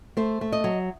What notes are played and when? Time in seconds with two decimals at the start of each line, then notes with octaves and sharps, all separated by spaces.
0.17 A3 C5
0.41 A3
0.52 D#5
0.64 F#3